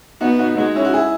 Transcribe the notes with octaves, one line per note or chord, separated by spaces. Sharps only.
B3 D#4 F#4
D#4 F#4
G#3 D#4 F#4
C#4 E4
F#4
E4 G#4